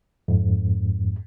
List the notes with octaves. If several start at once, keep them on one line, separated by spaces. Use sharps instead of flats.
F2 G#2